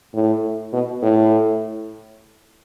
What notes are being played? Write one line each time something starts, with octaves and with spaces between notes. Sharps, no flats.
A2
B2
A2